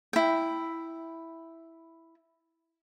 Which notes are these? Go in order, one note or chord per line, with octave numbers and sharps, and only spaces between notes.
E4 G5